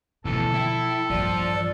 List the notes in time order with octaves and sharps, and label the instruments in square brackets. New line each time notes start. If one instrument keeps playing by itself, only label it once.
[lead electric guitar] D2 E3 [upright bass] B2 F3 [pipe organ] A4
[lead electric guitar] E4 [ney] G5
[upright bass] A#1 G2 [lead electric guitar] F3 [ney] D5